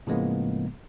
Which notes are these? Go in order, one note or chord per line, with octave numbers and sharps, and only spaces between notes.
A2 C#3 F3 G#3 A#3 B3